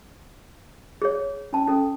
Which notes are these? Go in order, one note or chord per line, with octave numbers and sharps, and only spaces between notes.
G#4 C#5
C#4 A5
C#4 A4